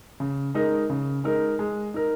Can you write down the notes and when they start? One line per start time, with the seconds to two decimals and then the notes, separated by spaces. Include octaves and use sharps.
0.20 C#3
0.54 G#3 D#4 A#4
0.90 C#3
1.24 G#3 D#4 A#4
1.59 G#3
1.94 D#4 A#4